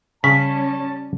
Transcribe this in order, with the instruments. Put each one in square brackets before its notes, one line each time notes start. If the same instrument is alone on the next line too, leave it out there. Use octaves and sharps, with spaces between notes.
[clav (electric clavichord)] C#3 [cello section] G3 C#4 [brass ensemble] C#5 A5 [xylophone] B6